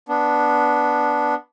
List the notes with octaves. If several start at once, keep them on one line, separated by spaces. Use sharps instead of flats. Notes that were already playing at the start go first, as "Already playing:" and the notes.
B3 D4